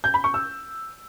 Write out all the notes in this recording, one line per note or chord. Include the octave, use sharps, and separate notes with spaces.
G6
B5
C#6
E6